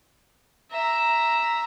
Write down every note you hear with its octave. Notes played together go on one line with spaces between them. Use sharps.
E5 A#5